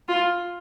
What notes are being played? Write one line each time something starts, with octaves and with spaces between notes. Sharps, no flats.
F4